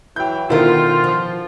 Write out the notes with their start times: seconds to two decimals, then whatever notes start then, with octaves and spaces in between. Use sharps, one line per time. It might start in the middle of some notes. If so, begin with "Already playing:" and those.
0.16 E3 F#3 E4 G5 G6
0.50 B2 D3 D#3 E4 F4 A#4 C5
1.04 F3